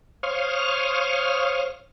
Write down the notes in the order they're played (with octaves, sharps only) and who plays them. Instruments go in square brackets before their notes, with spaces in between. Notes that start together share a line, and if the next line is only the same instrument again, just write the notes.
[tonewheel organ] C5 C#5 F5 C#6 D#6 F6